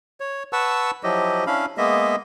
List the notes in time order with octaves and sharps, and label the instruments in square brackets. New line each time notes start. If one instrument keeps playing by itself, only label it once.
[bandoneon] C#5
B4 F#5 A5 C#6 E6
F3 F#3 E4 G4 D#5
C#4 D4 E4 F5 B5
G#3 A#3 B3 D#5 E5